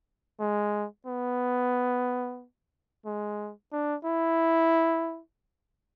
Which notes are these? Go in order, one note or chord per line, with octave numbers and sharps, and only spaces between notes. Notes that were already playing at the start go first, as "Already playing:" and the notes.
G#3
B3
G#3
D4
E4